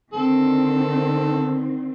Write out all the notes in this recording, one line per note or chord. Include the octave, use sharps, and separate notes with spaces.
D3 D#3 C4 A4